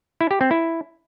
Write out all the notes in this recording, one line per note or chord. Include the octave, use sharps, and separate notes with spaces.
E4
G4
C4
E4